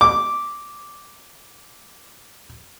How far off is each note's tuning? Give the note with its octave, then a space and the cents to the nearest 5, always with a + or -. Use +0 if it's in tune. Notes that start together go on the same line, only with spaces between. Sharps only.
D6 -5